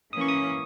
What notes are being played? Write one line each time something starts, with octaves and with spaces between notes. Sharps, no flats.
E3 A#3 C#4 D#6
C#6
D#6